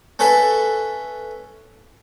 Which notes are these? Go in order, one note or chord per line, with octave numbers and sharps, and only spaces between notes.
C#4 A4 B4 E5